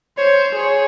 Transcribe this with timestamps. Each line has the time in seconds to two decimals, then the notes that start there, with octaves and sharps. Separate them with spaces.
0.17 C5 C#5
0.56 G#4 C#5